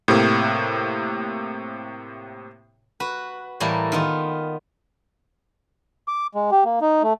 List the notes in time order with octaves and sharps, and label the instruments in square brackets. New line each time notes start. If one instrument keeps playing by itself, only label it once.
[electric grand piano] A2 C3 A#3
[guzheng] F#4 B4
A2 E3 G3 A#3
D#3 B3 F4
[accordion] D6
G#3
G4
A#3
D#4
A3